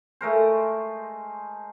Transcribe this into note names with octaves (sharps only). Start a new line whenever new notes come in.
G#3 A3 A#4 C5